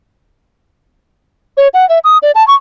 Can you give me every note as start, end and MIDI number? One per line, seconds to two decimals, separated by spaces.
1.57 1.68 73
1.74 1.88 78
1.89 1.99 76
2.04 2.18 87
2.22 2.31 74
2.35 2.46 81
2.48 2.54 85